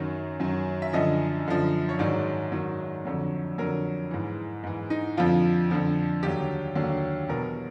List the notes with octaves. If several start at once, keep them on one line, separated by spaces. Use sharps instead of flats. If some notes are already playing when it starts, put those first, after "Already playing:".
Already playing: F#2 D#3 F#3
F#2 D#3 F#3
E5
F#2 D3 F3 D#5
F#2 D3 F3
C#5
G#2 D#3 F#3 D5
G#2 D#3 F#3
F2 D3 F#3
F2 D3 F#3 A#4
G#2 E3
G#2 E3
D#4
F2 D3 F3 F4
F2 D3 F3
D#2 D3 F#3 G4
D#2 D3 F#3
E2 B2 F#3 A#4